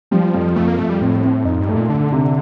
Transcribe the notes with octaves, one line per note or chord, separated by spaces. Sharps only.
F3 G3
F2
F2 A3
A#3
F2 A3
G3
A2 C4
C4
F2 D#4
G2
A3
A#2
D3 D4
C3